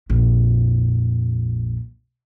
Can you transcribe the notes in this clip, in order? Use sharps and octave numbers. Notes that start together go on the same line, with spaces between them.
A#1 F2